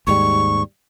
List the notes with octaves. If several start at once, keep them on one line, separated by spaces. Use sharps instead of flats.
D#2 G#2 G3 C#6